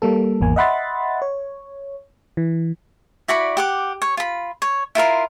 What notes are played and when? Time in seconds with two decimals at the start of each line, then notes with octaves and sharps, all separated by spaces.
0.02 G3 A#3 A4
0.40 G#1 E2 A#3 G#5
0.56 D#5 E5 F#5 B5 C6 A6
1.22 C#5
2.37 E3
3.28 E4 F#4 D5 B5
3.57 G4 F#5 D6
4.02 C#5
4.17 F4 B5
4.62 C#5
4.95 E4 F4 A#4 C6